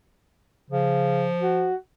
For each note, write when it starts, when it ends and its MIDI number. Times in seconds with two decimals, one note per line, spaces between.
0.70 1.29 49
0.70 1.69 53
1.41 1.75 66